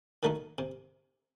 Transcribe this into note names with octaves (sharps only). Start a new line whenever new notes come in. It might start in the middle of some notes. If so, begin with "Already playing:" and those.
D#3 F#3 A3 D#4
C3